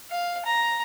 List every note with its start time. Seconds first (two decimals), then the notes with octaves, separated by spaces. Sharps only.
0.11 F5
0.46 A#5